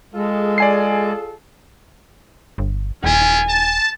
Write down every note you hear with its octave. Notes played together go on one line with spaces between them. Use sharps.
G#3 F4 G#4 A4
D5 G#5 C7
G1
D#1 C#4 E4 F4 G#5
A5